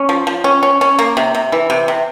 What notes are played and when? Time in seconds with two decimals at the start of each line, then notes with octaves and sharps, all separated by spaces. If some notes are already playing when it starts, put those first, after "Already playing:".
Already playing: C#4
0.09 F3
0.27 F3
0.44 C#4
0.63 C#4
0.81 C#4
0.99 A#3
1.17 C3
1.35 C3
1.52 E3
1.70 C3
1.88 C3